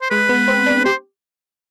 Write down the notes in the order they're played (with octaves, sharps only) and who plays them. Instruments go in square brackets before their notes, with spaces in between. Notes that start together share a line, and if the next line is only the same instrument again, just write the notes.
[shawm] C5
[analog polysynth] G#3 [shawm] B4
[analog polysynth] B3
C4
D4
[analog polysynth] G4 [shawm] C5